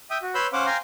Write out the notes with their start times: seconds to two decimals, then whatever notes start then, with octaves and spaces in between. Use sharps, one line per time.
0.10 E5 G5 D#6
0.22 F#4
0.35 B4 C#5 B5 C6 E6 G6
0.53 C#4 C5 F5 F#5 D6
0.66 F5 G5 G#5 A#5 C6